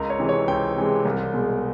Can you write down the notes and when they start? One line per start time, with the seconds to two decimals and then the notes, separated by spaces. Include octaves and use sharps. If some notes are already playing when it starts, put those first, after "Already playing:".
Already playing: C#2 A#4
0.10 C#5
0.19 C3 E3 G#3
0.29 C#5
0.48 C#2 G5
0.76 C3 E3 G#3
1.05 C2
1.34 B2 G#3